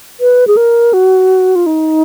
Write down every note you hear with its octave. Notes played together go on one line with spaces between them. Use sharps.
B4
G#4
A#4
F#4
F4
D#4